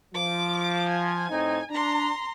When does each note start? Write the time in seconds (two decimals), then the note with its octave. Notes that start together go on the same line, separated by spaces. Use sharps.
0.14 F3 D6
0.89 G#5
1.30 A2 C4 D#4
1.71 D4 A#5 C6